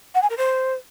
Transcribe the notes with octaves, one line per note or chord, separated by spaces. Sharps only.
F#5
G#5
A#4
C5